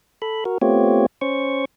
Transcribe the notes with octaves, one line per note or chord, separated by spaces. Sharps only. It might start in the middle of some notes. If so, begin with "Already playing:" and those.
A4 B5
F#4 A#4
A3 B3 C4 F4 G4 C#5
C#4 C5 C#6